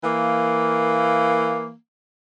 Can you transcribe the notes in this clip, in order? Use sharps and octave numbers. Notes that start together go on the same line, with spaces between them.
E3 A#3